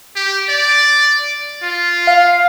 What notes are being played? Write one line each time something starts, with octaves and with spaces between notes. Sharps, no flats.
G4
D5
F4
F5